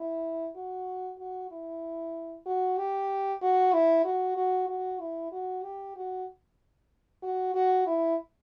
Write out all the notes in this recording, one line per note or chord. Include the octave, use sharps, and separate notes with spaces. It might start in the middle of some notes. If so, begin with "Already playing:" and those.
Already playing: E4
F#4
F#4
E4
F#4
G4
F#4
E4
F#4
F#4
F#4
E4
F#4
G4
F#4
F#4
F#4
E4